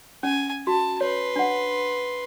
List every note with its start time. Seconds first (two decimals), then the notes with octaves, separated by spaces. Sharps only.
0.23 C#4 G#5
0.67 F#4 A5
1.01 B4 C#5 C6
1.36 D4 F#5